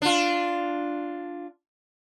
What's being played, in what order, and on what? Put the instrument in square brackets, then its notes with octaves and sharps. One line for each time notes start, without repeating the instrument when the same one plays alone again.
[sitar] D4 F4